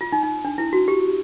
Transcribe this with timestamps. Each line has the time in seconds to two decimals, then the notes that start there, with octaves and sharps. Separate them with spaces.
0.01 F4
0.12 D#4
0.23 D#4
0.45 D4
0.58 E4
0.73 F#4
0.88 G4